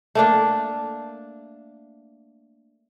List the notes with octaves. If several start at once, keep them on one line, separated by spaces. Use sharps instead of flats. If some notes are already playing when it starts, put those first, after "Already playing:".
A3 A#3 D4